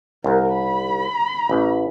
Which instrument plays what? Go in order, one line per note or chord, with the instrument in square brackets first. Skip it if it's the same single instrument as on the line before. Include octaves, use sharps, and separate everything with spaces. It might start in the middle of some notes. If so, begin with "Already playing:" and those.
[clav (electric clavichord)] C2 [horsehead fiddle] A#4
[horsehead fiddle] B5
[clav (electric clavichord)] A1